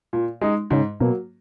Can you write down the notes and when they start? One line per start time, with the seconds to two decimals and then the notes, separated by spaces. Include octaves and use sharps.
0.13 A#2
0.41 G#3 D#4
0.70 G#2 C#3
1.00 B2 F#3 A#3